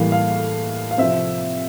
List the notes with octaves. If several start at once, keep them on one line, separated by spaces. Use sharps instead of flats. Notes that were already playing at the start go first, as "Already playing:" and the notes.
Already playing: A2 E3 G3 A#3 F5
F5
F5
C3 F3 C4 E5